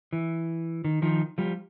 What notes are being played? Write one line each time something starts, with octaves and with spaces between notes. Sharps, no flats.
E3
D#3
D#3 F3
F3 G3